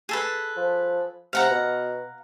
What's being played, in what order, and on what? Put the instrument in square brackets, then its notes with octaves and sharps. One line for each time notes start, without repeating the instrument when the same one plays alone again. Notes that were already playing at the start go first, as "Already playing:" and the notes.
[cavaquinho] G#4 A4 B4
[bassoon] F3
[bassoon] C3 [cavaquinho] F5 F#5 A#5
[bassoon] B2